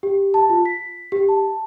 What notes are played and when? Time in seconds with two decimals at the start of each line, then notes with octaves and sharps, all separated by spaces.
0.03 G4
0.34 A5
0.50 F4
0.66 B6
1.12 G4
1.29 A5